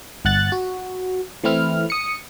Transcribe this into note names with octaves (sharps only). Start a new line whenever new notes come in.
G1 F#5 F#6 A6
F#4
E3 A3 C4 E4 F6
D#6 C#7